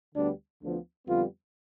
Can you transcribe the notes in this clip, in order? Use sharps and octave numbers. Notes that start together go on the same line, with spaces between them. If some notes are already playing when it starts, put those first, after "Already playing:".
D2 D3 G3 B3 D4
D2 D3 F3 B3
F2 D3 G3 B3 F4